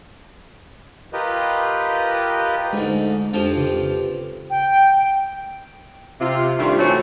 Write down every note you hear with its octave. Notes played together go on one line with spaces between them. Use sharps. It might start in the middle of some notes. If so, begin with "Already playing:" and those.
F4 G4 A#4 B4 D#5
D2 G#2 G#3
F2 F3 D4 G4 G5
C#3 G4 B4
G5
C3 F4
D#3 G3 A3 C4 D4 F4
E3 A3 C4 F#4 C#5